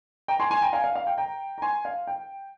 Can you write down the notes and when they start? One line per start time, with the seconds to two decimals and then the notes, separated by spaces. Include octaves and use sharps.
0.28 G5 A#5
0.40 G#5 C6
0.51 G#5 C6
0.62 G5 A#5
0.73 F5 G#5
0.84 F5
0.95 F5
1.07 G5
1.18 G5 A#5
1.58 A#5
1.62 G#5 C6
1.85 F5
2.07 G5